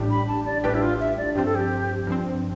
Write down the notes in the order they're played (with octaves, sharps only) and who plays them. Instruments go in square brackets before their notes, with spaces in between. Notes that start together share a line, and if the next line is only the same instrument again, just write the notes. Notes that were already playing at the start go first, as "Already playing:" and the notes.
Already playing: [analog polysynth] A1 A2 G3 D4 G4
[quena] B5
A5
D5
[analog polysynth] A1 A2 G3 D4 G4 [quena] B4
[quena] E4
F4
E5
D5
[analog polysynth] G2 F3 C4 [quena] G4
[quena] A4
G4
[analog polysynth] G2 F3 C4